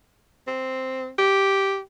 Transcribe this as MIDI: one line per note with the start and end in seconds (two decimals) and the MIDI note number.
0.48 1.10 60
1.18 1.79 67